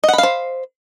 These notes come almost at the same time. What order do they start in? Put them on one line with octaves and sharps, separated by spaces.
D#5 F#5 B5 F5 C5